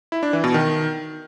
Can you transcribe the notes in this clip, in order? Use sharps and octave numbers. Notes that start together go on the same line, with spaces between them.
E4
D4
E3
B2
D#3